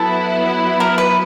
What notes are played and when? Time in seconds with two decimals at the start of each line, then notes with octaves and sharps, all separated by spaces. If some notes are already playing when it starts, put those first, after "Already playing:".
Already playing: F#3 B3 E4 A4
0.80 A#4
0.98 B4